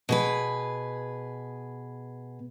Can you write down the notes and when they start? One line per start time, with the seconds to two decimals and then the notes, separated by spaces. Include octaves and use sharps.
0.09 B2 G#4 B4